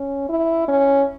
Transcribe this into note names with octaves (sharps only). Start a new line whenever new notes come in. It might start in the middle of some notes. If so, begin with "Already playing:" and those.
Already playing: C#4
E4
C#4